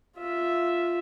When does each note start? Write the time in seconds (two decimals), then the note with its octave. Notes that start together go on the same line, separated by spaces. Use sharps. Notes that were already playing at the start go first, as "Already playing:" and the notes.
0.17 F4 E5